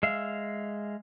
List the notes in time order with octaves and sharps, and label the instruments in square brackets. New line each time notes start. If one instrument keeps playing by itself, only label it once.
[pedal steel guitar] G#3 E5 F5